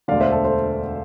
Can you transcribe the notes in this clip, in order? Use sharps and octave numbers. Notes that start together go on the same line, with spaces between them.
E1 D2 D3 D5 F5
C5 E5
A4
A4 C5